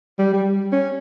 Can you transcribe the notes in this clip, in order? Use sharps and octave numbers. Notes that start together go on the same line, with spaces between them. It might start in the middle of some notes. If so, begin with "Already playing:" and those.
G3
G3
C#4